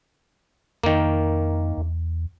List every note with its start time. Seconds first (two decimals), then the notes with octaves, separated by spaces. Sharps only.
0.84 F2 D#3 A#3
1.78 E2